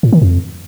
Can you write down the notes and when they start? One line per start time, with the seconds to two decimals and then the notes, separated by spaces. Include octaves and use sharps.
0.03 A2
0.12 D#3
0.22 F2